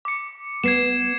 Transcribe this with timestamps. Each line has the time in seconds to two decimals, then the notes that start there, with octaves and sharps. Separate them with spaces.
0.05 D6 C#7
0.64 B3 G#6 C7 E7